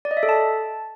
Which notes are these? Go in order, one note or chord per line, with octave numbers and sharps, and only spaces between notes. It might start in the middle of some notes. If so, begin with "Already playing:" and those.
D5
D#5
E5
A4
A5